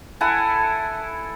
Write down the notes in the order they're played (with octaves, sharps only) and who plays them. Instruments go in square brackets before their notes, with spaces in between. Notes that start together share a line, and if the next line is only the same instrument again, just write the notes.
[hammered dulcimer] E4 A4 F#5 G#5